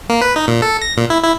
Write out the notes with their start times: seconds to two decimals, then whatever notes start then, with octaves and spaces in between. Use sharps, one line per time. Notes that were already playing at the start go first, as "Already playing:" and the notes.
0.09 A#3
0.21 B4
0.36 D#4
0.48 A#2
0.62 A4
0.82 A#6
0.97 A#2
1.10 E4
1.24 E4